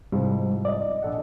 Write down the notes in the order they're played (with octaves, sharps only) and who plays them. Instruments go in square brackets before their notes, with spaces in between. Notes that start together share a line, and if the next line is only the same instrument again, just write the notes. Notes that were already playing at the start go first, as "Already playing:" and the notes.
[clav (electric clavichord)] C2 G#2 F3 [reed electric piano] G3
[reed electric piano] D5 D#5
[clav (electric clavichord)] A#1 A4 F#5